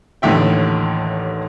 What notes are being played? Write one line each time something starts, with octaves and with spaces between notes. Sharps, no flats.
A1 D#2 A2 D3 E5 G5